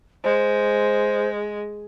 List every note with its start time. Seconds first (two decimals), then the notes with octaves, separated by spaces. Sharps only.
0.24 G#3 C5